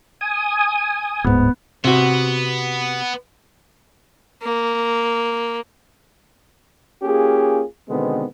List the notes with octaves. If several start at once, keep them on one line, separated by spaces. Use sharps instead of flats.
G#5 D#6
D1 G#2 B3
C3 B3 F#4
A#3
A#3 C#4 F4 G4 G#4
B2 D3 D#3 G#3 B3 C4